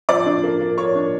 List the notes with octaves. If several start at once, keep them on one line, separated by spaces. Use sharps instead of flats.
F3 D5 D6
D4
A#3
A#3
A#3 C#5 C#6
D4